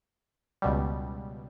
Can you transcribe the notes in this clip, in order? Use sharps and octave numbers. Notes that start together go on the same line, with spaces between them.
C#2 B2 G3